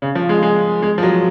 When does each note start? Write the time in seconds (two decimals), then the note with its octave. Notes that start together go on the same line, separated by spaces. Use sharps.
0.02 C#3
0.15 F3
0.29 G#3
0.43 G#3
0.82 G#3
0.98 F3
1.03 F#3